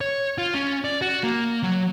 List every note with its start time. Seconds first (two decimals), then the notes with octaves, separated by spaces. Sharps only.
0.01 C#5
0.38 F4
0.54 C#4
0.84 D5
1.02 F#4
1.23 A#3
1.63 F#3